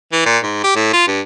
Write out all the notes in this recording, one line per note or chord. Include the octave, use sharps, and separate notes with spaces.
E3
A#2
G#2
G4
A2
F4
G2